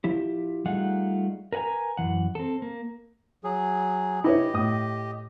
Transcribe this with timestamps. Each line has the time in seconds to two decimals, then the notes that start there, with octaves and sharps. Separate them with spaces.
0.04 F3 E4 G4
0.66 G3 A3 D#4 F4 G#4 F#5
1.52 A#4 B4 F#5 G#5 A#5
1.97 F#2 E3 F#5
2.35 C4 A4
2.62 A#3
3.44 F#3 G#4
4.24 E4 G4 B4 C#5 D#5
4.54 A2 D#6